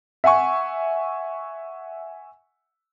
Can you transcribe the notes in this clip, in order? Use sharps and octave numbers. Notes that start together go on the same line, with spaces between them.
E5 F#5 G#5 C#6